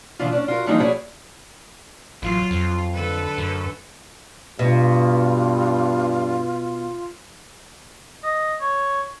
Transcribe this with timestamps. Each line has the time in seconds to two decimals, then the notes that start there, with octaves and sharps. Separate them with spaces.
0.19 B2 D3 E3 D4 F4
0.33 C#4 D4
0.48 F4 F#4 A#4
0.66 E3 F3 G3 A#3 D4 D#4
0.80 E4 F#4 G#4 A4 C#5 D5
2.22 A1 F#3 F4
2.51 F2
2.93 D3 A4 B4
3.38 F#2
4.59 G2 B2 F4
8.24 D#5
8.61 C#5